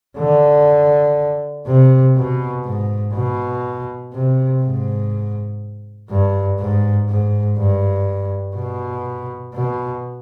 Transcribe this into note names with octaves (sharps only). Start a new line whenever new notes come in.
D3
C3
B2
G#2
B2
C3
G#2
G2
G#2
G#2
G2
B2
B2